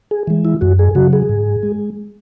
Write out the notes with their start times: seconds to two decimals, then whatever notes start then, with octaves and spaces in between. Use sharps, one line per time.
0.11 G#4
0.27 E3 G#3
0.45 E4
0.61 F#2 F#4
0.79 G#4
0.95 C#3 F#3 F#4
1.13 G#4
1.29 G#2
1.63 G#3